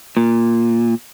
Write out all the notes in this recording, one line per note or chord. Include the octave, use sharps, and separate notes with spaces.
A#2